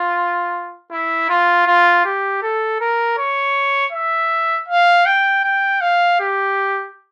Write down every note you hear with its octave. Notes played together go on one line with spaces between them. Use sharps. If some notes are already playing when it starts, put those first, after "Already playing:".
Already playing: F4
E4
F4
F4
G4
A4
A#4
C#5
E5
F5
G5
G5
F5
G4